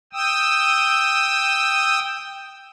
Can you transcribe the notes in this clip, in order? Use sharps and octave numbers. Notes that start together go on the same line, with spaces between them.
G5 D#6 E6